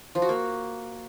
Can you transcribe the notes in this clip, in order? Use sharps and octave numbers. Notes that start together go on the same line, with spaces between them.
F3
F#4
A#3